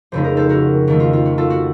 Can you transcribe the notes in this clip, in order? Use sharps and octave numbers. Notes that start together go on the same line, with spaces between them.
F1 F2 C#3 A3 D#4 C5
A#4
A4 C5
F#4 A#4
F2 D#3 A3
F4
F4
F#4
F4 A4
F#4